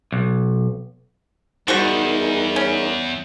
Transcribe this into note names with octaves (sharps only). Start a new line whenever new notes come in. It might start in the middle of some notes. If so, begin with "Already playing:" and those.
B1
E2 G3 D#4 F#4 G#4 A#4 C5 C#6
C#4